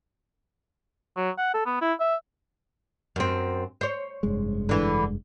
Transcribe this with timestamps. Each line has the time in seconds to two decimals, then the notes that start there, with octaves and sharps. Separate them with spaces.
1.16 F#3
1.38 F#5
1.54 A4
1.66 B3
1.81 E4
2.00 E5
3.16 F#2 C4
3.81 C5 C#5
4.23 F1 G2 G#3
4.69 D3 E3